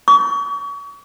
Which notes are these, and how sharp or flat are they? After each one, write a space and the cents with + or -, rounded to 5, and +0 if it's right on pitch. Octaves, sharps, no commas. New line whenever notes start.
C#6 +35